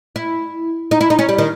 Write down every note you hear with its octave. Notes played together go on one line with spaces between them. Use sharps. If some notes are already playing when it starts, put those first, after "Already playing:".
E4
D#4
E4
D#4
C#4
G3
D#3